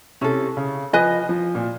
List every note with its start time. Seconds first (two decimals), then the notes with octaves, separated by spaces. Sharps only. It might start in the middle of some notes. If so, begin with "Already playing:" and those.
0.21 C3 C#4 E4 A4
0.57 C#3
0.93 F3 B4 D#5 G#5
1.29 F3
1.55 A#2